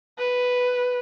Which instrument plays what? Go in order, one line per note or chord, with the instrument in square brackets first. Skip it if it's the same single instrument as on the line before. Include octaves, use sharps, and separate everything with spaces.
[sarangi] B4